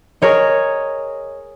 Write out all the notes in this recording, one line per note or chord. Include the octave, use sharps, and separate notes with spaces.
G#4 A#4 C#5 D#5